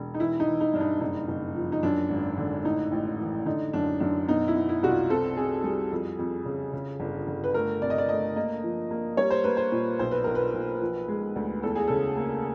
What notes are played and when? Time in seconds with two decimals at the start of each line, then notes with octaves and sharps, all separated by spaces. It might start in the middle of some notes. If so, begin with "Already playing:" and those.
Already playing: E1
0.14 D#4
0.19 E3 E4
0.40 D#4
0.47 E3
0.60 D#4
0.74 G2 D4
0.80 D#4
1.01 F#1 D#4
1.28 F#1
1.56 F3
1.72 D#4
1.83 F#2 D4
2.10 G#1
2.38 D3
2.64 A2 D#4
2.92 A1
3.19 E3
3.46 D3 D#4
3.73 F#2 D4
4.00 F#2 D4
4.28 B2 D#4
4.48 E4
4.55 B2
4.69 E4
4.83 C2 F#4
4.89 F4
5.09 C4 A4
5.37 C4 G#4
5.64 G3 G#4
5.91 F2
6.18 F2
6.45 C#3
6.73 C#3
7.00 G1
7.28 G1
7.44 B4
7.54 A3 A#4
7.82 C3 D5
7.90 D#5
7.98 D5
8.09 A3 D#5
8.36 A#3 D#5
8.64 F3
8.91 A#3
9.17 G3 C#5
9.30 C5
9.44 A#3 B4
9.57 C5
9.72 A#2
9.99 B1 C5
10.11 B4
10.24 B1 A#4
10.35 B4
10.54 B1
10.81 F3
11.08 G#3
11.36 D2
11.63 E2 A4
11.76 G#4
11.88 C#3 A4
12.17 A#3